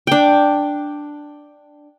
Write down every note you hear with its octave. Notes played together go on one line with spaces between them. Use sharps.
D4 G5